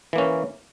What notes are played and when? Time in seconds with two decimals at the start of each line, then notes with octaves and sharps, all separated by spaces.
0.13 E3
0.16 A#3
0.18 C#4